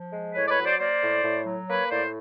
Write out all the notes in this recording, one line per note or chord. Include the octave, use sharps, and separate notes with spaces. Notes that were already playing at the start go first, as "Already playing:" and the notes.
Already playing: F3
G#3
A2 B4 C#5
D5
B4 C#5
F#3
C5 D5
A#3 C5 D5
A2
A2
F#3
A#3 B4 C#5
A2 C5 D5